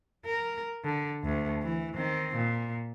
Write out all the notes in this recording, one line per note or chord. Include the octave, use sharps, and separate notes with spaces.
A#4
D3
D2
E3
D#3 C4
A#2